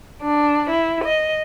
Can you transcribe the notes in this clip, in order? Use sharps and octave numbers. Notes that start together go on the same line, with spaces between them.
D4
E4
D#5